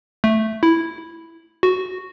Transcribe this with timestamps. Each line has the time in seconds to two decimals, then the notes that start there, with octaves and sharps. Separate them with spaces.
0.24 A3
0.63 E4
1.63 F#4